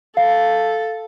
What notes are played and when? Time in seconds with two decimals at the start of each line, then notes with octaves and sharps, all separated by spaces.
0.17 A4 F5